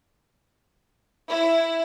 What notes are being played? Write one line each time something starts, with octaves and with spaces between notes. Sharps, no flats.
E4